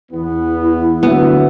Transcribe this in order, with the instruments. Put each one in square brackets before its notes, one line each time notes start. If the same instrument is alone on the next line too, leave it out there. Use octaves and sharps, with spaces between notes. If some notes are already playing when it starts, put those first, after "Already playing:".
[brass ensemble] E2 B3 [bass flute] E4
[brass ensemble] D2 F#3 E5 [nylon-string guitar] B3